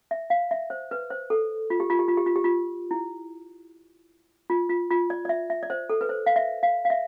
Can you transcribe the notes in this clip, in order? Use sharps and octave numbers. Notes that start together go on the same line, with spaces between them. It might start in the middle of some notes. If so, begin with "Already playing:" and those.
E5
F5
E5
C5
B4
C5
A4
F4
G4
F4
G4
F4
G4
F4
G4
F4
E4
F4
F4
F4
D5
D5
E5
E5
D5
C5
A4
B4
C5
F5
E5
F5
F5
E5